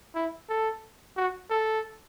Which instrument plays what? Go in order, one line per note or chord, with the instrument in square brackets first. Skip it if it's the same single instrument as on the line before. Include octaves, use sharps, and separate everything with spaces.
[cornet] E4
A4
F#4
A4